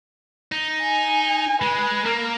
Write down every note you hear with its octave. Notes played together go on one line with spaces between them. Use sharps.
D#4
G#5
G#3 B4
A#3 A#4